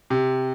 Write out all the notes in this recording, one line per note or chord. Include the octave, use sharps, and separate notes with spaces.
C3